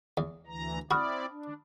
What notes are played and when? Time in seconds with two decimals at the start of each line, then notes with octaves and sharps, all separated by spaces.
0.17 E2
0.47 D2 E3 A#5
0.91 C4 E4 F#4 D5 B5 D#6 F6
1.31 D4